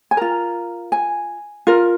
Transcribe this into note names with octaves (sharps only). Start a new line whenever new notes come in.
G#5
F4 A#4 A#5
G#5
F4 A#4